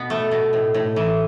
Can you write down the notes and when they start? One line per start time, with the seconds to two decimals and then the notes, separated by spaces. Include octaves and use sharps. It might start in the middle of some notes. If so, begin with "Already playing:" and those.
Already playing: B2 B3
0.10 A3
0.31 B2
0.53 A2
0.74 A2
0.96 E3